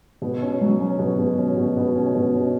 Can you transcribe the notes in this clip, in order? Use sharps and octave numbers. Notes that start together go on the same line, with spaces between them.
B2
C#4
F#3
C#4
B2
B2
C#4
B2
B2
C#4
B2
C#4